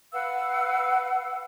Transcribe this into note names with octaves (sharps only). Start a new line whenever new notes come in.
B4 F5 F#5 E6